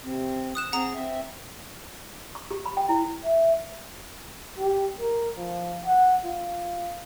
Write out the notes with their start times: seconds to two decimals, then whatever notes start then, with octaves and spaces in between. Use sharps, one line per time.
0.04 C3 C4
0.55 D#6 F#6 E7
0.72 C4 G#4 F#5 A#5 D#6
0.94 C4 E5
2.35 C#6
2.51 G4
2.66 B5
2.77 G5
2.89 E4
3.24 E5
4.59 G4
5.00 A#4
5.37 F3
5.85 F#5
6.25 F4